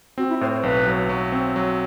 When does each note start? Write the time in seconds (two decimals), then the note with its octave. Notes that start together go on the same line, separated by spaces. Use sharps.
0.18 C4 F#4
0.29 E4
0.41 A2 C5
0.52 C5
0.63 B1 B4
0.87 F#3
1.09 F#3
1.32 C4
1.56 F#3